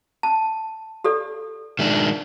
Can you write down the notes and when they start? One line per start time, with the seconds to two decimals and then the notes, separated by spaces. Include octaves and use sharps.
0.23 A5
1.04 G4 A4 D5
1.79 D#3 G#3 D4